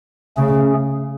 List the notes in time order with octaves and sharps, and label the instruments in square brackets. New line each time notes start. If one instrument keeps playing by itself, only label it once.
[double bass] C#3 [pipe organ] A3 C#4 G#4